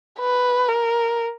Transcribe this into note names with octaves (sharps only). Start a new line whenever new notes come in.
B4
A#4